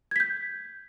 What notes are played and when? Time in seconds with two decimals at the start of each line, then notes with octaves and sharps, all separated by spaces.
0.11 G#6
0.16 B6
0.20 G6